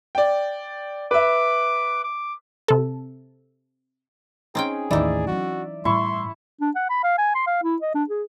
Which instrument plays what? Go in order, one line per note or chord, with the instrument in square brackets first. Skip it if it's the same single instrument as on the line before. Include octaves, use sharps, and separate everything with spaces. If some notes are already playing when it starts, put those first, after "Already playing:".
[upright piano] D5 G5
[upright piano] B4 E5 [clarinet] D6
[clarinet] D6
[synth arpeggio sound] C3 A4
[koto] C4 C#4 G5 [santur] D#4 [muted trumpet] G#4
[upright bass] A1 D#2 [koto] E3 D#4 [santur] D5 E5
[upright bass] F#3 C#4 [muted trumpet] F#4
[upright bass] A2 G3 [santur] E4 C#6 [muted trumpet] C6
[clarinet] D4
F#5
B5
F5
G#5
C6
F5
E4
D#5
D4
G#4